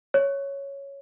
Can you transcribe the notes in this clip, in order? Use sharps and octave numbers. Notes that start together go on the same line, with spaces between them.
C#5